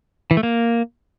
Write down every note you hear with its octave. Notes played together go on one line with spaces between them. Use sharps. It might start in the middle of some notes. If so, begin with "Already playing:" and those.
E3
A3
A#3